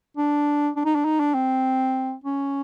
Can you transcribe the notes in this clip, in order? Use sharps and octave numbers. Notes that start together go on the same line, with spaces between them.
D4
D4
D#4
D4
D#4
D4
C4
C#4